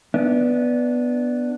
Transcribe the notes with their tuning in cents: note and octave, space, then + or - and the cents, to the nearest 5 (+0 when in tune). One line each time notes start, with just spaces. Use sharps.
B3 +0 D4 +0 E5 -30